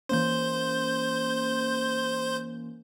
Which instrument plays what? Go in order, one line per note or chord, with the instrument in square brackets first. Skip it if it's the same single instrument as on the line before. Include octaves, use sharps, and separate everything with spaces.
[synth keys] E3 A#3 C#4 [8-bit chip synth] C5 G6